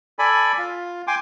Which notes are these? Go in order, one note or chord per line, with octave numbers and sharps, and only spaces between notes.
A4 D5 G#5 B5
F4
G5 G#5 C6 D6